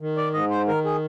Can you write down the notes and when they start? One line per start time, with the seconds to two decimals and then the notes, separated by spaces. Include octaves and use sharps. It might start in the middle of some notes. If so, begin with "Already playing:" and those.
0.01 D#3
0.17 D5
0.33 G#2 D#5
0.50 C5
0.68 D#3 A#4
0.85 G#4